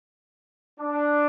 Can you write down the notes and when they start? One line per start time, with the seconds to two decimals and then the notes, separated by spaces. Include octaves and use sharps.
0.80 D4